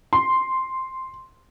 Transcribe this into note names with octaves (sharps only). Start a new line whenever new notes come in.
C6